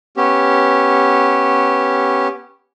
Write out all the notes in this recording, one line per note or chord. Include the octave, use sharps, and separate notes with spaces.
B3 C#4 G4